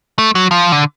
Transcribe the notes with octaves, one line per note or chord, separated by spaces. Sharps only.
A3
F#3
F3
D3